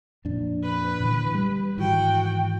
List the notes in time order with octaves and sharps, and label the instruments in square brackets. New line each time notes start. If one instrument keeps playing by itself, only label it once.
[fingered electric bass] F2 A#2 D4
[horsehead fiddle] B4
[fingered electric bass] A#2 D3 E3
G3
[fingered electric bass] G#2 D#3 E3 [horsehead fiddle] F#4 G5